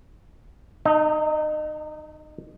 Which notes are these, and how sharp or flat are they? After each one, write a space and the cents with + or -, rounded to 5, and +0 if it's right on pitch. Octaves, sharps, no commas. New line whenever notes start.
D#4 -30 D#5 +25 A5 +45